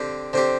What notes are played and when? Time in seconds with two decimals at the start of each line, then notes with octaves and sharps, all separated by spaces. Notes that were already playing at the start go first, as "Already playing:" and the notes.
Already playing: D3 C4 G4
0.33 D3 C4 G4 C5